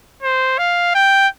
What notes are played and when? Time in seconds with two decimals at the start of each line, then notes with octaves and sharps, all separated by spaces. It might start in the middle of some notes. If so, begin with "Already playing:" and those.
0.23 C5
0.59 F5
0.95 G5